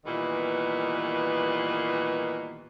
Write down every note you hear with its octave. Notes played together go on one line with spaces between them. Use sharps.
A#2 D#3 E3 G3 B3